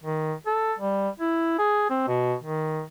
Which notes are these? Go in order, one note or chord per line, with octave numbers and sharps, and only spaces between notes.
D#3
A4
G3
E4
G#4
C4
B2
D#3